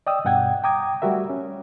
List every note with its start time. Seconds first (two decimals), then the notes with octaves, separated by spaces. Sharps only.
0.07 D5 D#5 G5 D#6 E6
0.25 G2 B2 F#5 G5 G#6
0.64 G5 A#5 D6 D#6 G#6
1.02 G3 A3 F#4 A#4 E5
1.30 C#4